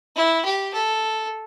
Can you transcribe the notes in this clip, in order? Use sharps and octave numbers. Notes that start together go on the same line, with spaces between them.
E4
G4
A4